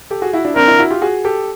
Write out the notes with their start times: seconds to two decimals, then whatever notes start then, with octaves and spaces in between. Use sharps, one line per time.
0.11 G4 A4
0.22 F#4 G#4
0.34 E4 F#4
0.45 D4 E4
0.56 C4 D4 A#4
0.68 D4 E4
0.79 E4 F#4
0.90 F4 G4
1.02 F#4 G#4
1.25 G4 A4